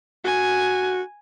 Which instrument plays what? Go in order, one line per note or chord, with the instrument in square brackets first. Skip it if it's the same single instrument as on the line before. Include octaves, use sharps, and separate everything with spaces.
[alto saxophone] F#4 [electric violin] G#5